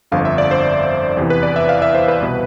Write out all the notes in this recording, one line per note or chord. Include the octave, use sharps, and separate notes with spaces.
G1 F2 D3 F3 F5
E5
D5
C5
E2 C3 E3
B4
D5
E5
F5
E5
C5
B4
C2 B2